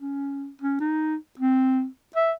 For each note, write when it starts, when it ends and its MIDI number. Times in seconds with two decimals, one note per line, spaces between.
0.01 0.49 61
0.62 0.77 61
0.80 1.16 63
1.39 1.87 60
2.16 2.32 76